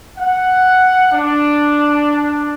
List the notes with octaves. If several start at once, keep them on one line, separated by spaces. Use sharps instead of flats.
F#5
D4